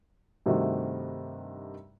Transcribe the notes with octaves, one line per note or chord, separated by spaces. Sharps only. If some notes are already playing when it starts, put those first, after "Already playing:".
G2 C3 D#3 A3 F#4